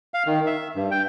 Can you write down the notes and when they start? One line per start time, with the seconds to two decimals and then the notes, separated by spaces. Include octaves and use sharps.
0.14 F5
0.27 D#3
0.47 E5
0.75 G2
0.91 G5